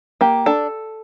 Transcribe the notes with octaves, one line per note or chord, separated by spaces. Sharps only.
A#3 G4
D4 A4